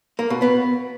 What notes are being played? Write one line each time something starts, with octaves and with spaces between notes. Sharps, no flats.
A#3
B2
B3